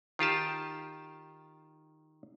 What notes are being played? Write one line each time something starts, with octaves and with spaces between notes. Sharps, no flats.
D#3 F4 G4 A5